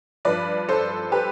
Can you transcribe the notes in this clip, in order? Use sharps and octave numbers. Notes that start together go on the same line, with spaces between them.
G2 F3 B4 D5
A4 C5
G4 B4